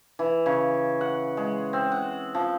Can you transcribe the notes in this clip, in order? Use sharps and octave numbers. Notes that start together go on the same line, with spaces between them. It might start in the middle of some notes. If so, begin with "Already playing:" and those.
E3
C#3
F#5
G#3
C4
F#5
F3